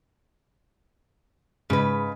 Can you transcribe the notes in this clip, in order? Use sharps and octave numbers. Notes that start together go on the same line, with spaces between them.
G#2 C#3 B4